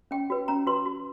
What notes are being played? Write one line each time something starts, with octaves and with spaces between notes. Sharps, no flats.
C#4 G5
F#4 B4
C#4 A#5
F#4 B4 C6
F#4